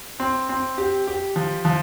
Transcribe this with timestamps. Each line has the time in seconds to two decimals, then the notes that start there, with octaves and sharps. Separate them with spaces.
0.20 C4
0.49 C4
0.78 G4
1.08 G4
1.36 F3
1.65 F3